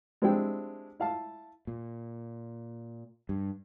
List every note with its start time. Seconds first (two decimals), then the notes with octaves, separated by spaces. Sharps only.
0.22 G#3 C4 D4 E4 G4 G5
1.00 E4 F5 A5
1.67 A#2
3.29 G2